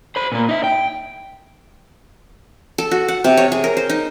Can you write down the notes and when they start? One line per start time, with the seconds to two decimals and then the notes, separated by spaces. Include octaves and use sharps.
0.16 C5 B5
0.32 A#2 A#3
0.49 D#4 E5
0.64 G5
2.78 A4
2.91 F#4
3.08 F#5
3.24 C3
3.37 C#5
3.52 G#4
3.64 A#4
3.77 C5
3.90 D#4